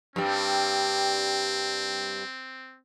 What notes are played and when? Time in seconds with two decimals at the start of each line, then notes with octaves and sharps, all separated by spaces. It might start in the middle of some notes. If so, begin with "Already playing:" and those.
0.16 G2 G3 C4